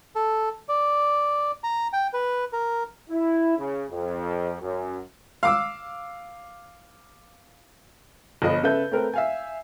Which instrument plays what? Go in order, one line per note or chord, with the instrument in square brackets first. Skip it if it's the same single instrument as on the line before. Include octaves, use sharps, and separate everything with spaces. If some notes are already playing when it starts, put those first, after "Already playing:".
[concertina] A4
D5
A#5
G5
B4
A#4
[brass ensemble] E4
C#3
F2
F#2
[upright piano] F5 D6 E6
G1 F3 D#5 B5
C#3 A4 B4 E5 G6
A3 C4 A#4 B4
E5 F5 G#5